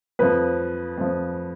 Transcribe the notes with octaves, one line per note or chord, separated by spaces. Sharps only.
F2 F3 B4
F2 F3